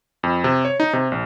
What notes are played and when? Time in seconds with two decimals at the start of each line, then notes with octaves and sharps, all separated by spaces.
0.23 F2
0.44 C3
0.65 C#5
0.80 D#4
0.93 C3
1.12 A#1